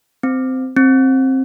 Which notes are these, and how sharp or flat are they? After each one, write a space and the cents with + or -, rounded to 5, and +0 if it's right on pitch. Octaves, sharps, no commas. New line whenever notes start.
C4 -15
C4 +15